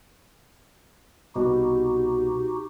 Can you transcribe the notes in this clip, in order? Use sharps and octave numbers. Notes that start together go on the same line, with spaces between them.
C2 B2 D#4 F#4 G4